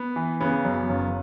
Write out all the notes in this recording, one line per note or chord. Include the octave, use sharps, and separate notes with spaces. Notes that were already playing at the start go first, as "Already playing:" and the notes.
Already playing: B3
E3
C#3 B3
F#2
F#1